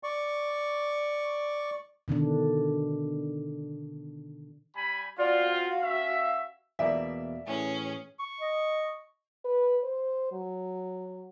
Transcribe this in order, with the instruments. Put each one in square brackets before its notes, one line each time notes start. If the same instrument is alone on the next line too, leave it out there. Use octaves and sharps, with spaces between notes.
[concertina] D5 C#6
[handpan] B2 D3 D#3 D4
[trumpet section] G3 G#5 B5
[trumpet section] C4 F4 [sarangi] F#4 [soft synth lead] D5
[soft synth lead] F5
[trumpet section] C#4 E5
[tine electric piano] E2 B2 A#3 [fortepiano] D5 E5
[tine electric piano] A2 E3 [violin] C#4 G#4
[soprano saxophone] C#6
[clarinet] D#5
[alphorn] B4
C5
F#3